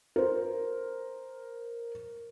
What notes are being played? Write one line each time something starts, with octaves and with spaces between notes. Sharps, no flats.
A#4 C5